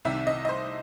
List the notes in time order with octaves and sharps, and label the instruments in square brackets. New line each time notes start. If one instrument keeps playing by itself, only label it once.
[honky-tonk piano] C2 C3 D#3 E5
D#5
D#5
C5